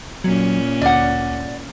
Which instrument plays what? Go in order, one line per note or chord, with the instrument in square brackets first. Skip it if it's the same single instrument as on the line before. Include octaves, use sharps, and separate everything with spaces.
[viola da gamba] A#2 C#4 [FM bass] F#3
[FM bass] D2 [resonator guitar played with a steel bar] D5 F#5